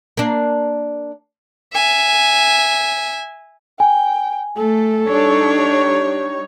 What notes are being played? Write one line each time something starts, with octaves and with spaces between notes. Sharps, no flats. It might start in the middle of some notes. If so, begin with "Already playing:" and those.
A#3 D4
E5 G#5
G5 G#5
A3 A4
G3 D4 D#4 C#5